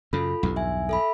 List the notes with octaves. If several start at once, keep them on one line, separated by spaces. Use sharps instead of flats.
F#2 C#3 F4 A4 B5
B1 E2 G2
E5 G#5
A4 E5 B5